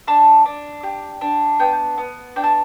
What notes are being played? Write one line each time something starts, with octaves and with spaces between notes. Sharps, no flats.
D4 A5
D4
G4
D4
B3 G5
B3
D4 G5
A5